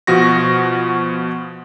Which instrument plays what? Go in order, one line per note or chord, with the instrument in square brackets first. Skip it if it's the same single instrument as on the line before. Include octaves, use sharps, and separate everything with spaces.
[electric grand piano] B2 F3 F#4 C#6 A#6